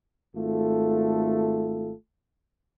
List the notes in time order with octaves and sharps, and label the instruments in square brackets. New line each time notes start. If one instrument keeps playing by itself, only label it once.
[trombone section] G#1 A3 F4 A4